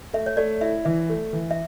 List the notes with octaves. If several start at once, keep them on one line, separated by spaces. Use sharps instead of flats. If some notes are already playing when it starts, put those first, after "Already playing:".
A3 E5
C#5
A3 D5
E4 E5
E3 E5
A3
E3
E5